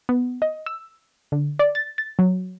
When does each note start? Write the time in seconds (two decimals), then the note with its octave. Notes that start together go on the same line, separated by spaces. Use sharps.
0.09 B3
0.42 D#5
0.66 E6
1.32 D3
1.59 D5
1.75 A6
1.98 A6
2.19 F#3